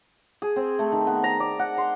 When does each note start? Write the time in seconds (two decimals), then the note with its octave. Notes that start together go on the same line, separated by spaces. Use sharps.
0.42 G#4
0.56 C4
0.79 A3
0.92 D#3
1.07 B3
1.24 A#5
1.40 D5
1.59 F#5
1.78 C6